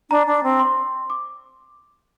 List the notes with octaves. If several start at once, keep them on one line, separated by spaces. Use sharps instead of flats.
D4 A#5
D4
C4
C6
D6